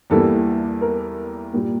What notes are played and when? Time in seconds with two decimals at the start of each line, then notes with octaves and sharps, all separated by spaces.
0.10 E2 E3 G3 A#3 A4
0.81 A#4
1.52 A#2 G3 A#3